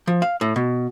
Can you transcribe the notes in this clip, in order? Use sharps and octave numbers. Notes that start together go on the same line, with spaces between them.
F3
F5
A2
B2